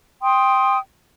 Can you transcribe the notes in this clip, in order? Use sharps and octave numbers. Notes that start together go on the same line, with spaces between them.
G5 C6 D#6